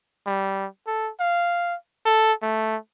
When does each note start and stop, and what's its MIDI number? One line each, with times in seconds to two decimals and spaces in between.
0.26 0.66 55
0.87 1.11 69
1.20 1.75 77
2.06 2.32 69
2.42 2.77 57